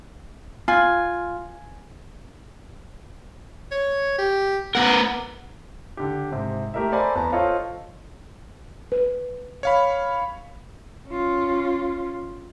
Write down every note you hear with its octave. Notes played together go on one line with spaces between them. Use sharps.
F4 G#5
C#5
G4
B3 A#4 F#5
D3 G4
G#2 C3
A3 G4 A#4 D#5 E5
A4 C5 D5 G#5 A#5 B5
E2 B4 A5 A#5
F4 A4 C5 C#5 D#5
B4
C#5 F5 B5
C#4 F4